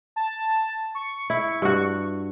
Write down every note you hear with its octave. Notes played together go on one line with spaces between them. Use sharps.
A5
C#6
E4
G2 F#4